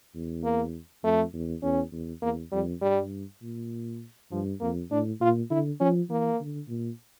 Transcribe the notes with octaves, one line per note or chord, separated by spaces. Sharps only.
E2
A#3
F2 A3
E2
E2 C#4
E2
E2 A#3
F2 G3
G2 G3
A#2
G2 F3
F2 A#3
A2 D4
A#2 F4
D3 E4
F3 C#4
E3 A#3
D3
A#2